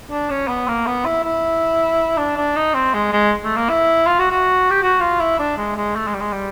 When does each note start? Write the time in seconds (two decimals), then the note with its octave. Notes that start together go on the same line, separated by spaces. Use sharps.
0.11 D4
0.30 C#4
0.48 B3
0.67 A#3
0.86 B3
1.05 E4
1.24 E4
2.18 D4
2.37 D4
2.56 D#4
2.74 C4
2.94 G#3
3.12 G#3
3.44 A3
3.56 A#3
3.69 E4
4.06 F4
4.19 F#4
4.31 F#4
4.71 G4
4.82 F#4
5.00 F4
5.20 E4
5.39 D4
5.57 G#3
5.76 G#3
5.96 A3
6.07 G#3
6.14 G3
6.20 G#3
6.32 G3